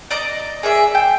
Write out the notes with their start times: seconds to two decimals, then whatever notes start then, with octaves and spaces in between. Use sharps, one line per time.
0.11 D5 D#5 A#5 D6
0.63 G#4 D5 E5
0.95 G5